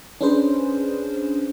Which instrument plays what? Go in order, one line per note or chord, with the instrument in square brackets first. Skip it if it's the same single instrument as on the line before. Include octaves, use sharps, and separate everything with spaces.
[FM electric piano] C#4 D4 G#4 B4 C5